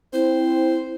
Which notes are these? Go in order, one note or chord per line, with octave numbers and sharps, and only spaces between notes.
C4 E4 C5